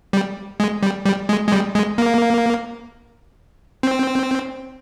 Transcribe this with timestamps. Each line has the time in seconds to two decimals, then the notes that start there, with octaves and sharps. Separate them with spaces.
0.13 G3
0.60 G#3
0.83 G3
1.05 G3
1.29 G#3
1.48 G#3
1.52 G3
1.75 G#3
1.98 A#3
3.83 C4